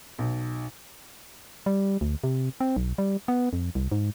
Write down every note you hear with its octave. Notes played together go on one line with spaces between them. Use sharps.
B1
G3
D2
C3
C4
B1
G3
B3
F2
C2
G#2